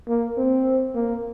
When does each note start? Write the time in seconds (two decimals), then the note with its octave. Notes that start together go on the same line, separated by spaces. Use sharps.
0.08 A#3
0.37 C4
0.95 A#3